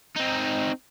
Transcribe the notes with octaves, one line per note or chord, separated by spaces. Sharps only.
C4 D#4